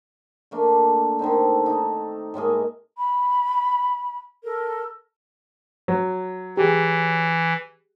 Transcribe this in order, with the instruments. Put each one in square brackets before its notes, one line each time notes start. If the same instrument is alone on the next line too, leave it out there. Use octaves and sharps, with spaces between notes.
[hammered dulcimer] A3 A#3 D4
D3 D#3 C4 D#4
D#4 A4
A2 G#3 A#3 G#4
[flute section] B5
A4 A#4
[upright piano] F#3
[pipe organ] E3 [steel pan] G4 G#4